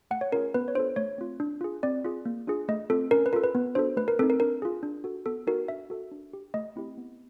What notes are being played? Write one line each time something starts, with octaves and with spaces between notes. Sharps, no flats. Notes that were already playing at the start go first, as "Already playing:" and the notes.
A3 F#5
C#5
C#4 F4 G#4 A#4
B3 B4
C#5
D4 F4 A4 C5
A3 C#5
C4 F4
D4
F4 G#4
C4 D5
F4 G#4
A#3
D4 F4 G#4
A3 D#5
C4 F4 A4
C#4 A#4
B4
F4 A4 A#4
B4
B3
D4 F#4 A4 C5
A3 B4
A#4
C4 D#4 A4
A#4
D4 A#4
F4 G#4
D4
F#4 A4
B3 A4
D#4 F#4 A4 A#4
D4 E5
F#4 A4
D4
G4
A3 D#5
C4 E4 G4
B3